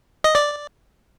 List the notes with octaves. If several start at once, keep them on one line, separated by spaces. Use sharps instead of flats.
D#5
D5